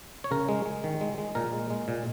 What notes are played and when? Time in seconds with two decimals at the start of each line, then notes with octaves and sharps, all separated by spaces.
0.24 C#5
0.31 C#3 A#4
0.49 G#3
0.65 G#3
0.84 D#3
1.01 G#3
1.18 G#3
1.35 A#2 A#4
1.53 G#3
1.70 G#3
1.88 A#2